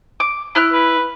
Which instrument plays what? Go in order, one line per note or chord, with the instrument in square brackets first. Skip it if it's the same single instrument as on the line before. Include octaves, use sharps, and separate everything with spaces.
[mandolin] D6
E4 F6 F#6
[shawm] B4